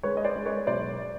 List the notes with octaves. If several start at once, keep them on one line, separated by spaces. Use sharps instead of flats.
G#3 B4 C#5
D#5
C5 D5
G#3
B4 C#5
B1 C5 D5